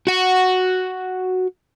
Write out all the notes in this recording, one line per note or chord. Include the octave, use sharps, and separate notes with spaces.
F#4 F#5